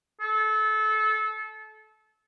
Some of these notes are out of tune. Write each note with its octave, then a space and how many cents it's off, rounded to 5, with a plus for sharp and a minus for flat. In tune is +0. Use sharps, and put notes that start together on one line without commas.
A4 -25